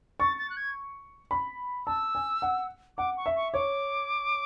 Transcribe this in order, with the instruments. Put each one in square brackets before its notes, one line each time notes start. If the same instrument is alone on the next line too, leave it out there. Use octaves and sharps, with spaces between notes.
[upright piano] C#6 [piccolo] A6
[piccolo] A6
F#6
G#6
[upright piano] B5
[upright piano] A5 [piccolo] E6
[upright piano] G#5
F#5
[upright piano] F#5 [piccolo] D6
[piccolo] C#6
[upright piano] E5
[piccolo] C#6
[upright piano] C#5 [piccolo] D6